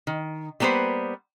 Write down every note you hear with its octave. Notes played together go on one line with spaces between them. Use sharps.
D#3
G3 A#3 B3 B4 C5